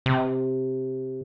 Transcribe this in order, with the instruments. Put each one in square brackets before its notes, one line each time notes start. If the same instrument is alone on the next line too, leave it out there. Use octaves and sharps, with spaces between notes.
[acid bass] C3